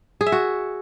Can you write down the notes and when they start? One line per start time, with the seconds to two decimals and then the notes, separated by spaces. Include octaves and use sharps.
0.21 G#4
0.26 E5
0.32 F#4